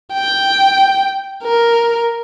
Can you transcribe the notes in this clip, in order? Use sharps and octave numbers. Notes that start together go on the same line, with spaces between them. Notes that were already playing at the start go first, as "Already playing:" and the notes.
G5
A#4